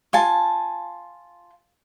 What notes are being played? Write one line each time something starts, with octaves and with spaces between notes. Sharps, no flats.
F4 G#5 A5